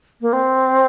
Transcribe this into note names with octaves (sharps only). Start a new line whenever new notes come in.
A#3
C4